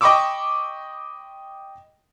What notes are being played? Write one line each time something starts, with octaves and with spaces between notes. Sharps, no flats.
D#5 G5 B5 C#6 D6 E6